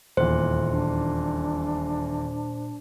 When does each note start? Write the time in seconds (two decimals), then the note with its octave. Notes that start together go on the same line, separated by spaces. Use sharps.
0.17 D#1 E2 A#2 C5
0.71 D4